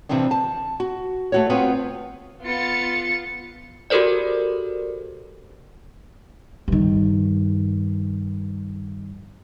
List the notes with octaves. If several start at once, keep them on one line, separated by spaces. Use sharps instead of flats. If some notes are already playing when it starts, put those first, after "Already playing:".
C3 E3 F3 C4 D4
A5
F#4
A3 F#4 C#5
B3 C4 F4 B4 C#5
B3 F4 A6 C#7
F#4 G4 A4 A#4 C5 D5
G2 D#3